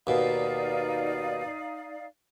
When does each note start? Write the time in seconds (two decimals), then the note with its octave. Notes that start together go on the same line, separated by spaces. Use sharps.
0.07 D#2 B2 D#4 D5 F5